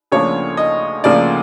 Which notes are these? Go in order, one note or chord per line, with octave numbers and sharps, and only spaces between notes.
D2 C#3 F3 A#3 D4 C#5
D#5
D2 C#3 F3 A#3 D5